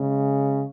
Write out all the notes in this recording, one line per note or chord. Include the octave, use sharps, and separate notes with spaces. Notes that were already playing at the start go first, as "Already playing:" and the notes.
Already playing: C#3 G#3